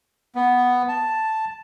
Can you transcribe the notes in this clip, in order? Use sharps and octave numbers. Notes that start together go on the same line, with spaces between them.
B3
A5